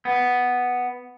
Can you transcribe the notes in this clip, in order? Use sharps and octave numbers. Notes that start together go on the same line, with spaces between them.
B3